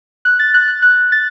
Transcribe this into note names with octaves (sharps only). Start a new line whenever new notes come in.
F#6
A6
F#6
F#6
F#6
A6